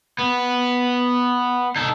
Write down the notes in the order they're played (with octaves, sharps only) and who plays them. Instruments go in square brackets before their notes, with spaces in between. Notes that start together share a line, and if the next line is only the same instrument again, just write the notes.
[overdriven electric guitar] B3
D#4 A4